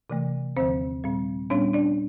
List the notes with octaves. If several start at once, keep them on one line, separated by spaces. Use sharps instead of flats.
C3 E3 A3
D#2 D3 F3 C4 C5
A#2 G3 C4
A#2 G3 B3 C#4 D4 C#5
D4 D5